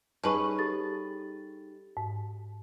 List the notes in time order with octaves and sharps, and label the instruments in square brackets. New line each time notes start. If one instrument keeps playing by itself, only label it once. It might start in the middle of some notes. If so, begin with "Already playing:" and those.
[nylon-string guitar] G3 D#4 G#4 [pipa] C#4 B4 [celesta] A5 C#6
[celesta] G4 A4 A6
[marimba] G#2